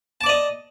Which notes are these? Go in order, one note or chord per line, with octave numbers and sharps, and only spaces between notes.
D5 D#5 A5 D6